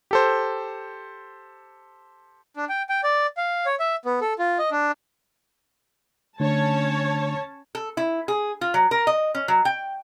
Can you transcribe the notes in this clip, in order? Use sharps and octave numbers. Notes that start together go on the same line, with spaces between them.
G4 A4 C5
D4
G5
G5
D5
F5
C#5
E5
B3
A4
F4
D#5
D4
D3 A3 C#4 D4 C#5 A5
A4
E4
G#4
F4
F#3
A#4
D#5
C#4
F#3
G5